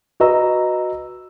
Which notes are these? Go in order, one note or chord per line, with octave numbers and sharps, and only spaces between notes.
F#4 B4 D#5 A#5 E6